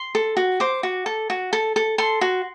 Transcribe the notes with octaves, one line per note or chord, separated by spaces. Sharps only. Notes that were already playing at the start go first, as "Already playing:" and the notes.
Already playing: C6
A4
F#4
C5 D6
F#4
A4
F#4
A4
A4
A4 C6
F#4